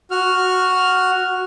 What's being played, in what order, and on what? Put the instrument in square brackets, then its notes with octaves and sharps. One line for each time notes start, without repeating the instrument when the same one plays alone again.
[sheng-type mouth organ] F#4 F6